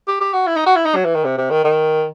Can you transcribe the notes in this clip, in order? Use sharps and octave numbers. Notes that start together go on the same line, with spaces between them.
G4
G4
F#4
E4
D#4
F#4
E4
D#4
F#3
E3
D#3
C3
C3
D#3
D#3